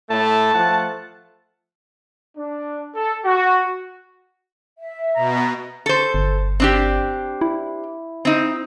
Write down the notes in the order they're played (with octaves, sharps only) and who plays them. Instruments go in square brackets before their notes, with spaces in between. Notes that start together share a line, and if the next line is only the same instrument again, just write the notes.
[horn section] A2 A3 [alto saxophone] A5
[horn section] F3 A3 F#5
[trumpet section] D4
A4
F#4
[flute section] E5
[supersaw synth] B2 [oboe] A#5
[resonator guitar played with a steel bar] A4 C5
[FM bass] G1
[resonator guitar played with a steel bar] C4 D4 G4
[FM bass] E4
[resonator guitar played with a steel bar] C4 D#4